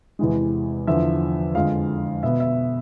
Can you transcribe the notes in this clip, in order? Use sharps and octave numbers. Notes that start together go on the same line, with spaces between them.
E2 C3 E3 G#3
E2 D3 F3 E5
F2 D3 G#3 F5
B2 B3 E5
E5